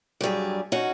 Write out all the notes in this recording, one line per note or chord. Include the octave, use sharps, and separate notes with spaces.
G2 F#3 G3 G#4
C#4 D#4 F#4